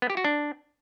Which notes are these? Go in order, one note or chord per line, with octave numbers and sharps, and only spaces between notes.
B3
G4
F#4
D4